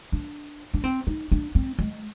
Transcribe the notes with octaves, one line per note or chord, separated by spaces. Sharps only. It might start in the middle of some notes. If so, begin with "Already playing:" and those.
D4
D4
C4
D#4
D4
C4
G#3